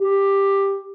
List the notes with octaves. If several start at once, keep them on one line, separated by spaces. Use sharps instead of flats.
G4